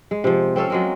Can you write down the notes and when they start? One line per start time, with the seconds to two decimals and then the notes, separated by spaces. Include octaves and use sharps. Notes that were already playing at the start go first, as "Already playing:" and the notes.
0.11 G#3
0.24 C3 F3
0.56 C4 C#4 A4 F5
0.70 F#3 G#3 A#3